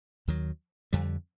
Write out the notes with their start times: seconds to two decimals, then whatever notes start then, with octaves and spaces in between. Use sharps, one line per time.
0.28 D#2 D#3 F#3
0.93 F2 D3 G3